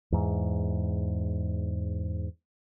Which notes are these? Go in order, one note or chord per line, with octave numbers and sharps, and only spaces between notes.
E2 G#2